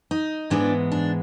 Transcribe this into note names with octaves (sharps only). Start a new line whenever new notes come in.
D#4
G#2 E3 G#3 B3 D4
D4